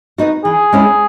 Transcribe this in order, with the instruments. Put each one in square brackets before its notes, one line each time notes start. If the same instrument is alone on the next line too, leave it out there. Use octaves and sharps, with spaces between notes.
[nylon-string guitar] B3 D#4 F#4
[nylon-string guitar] E3 [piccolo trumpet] G#4
[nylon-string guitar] G#3 C#4 E4